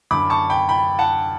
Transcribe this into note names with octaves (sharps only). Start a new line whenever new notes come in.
F#2 D3 B5 D6
A5 C#6
G5 B5
G5 B5
F#5 A5